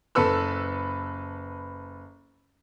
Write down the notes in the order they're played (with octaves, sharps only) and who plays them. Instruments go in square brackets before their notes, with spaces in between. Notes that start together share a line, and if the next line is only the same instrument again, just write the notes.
[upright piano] F#1 A4 B4 E6